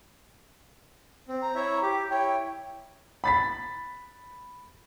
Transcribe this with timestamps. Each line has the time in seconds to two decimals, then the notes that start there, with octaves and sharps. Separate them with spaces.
1.28 C4
1.42 A#5
1.55 E4 C#5 E5
1.82 G4 D6
2.10 E4 C#5 G5
3.24 B5 A6 B6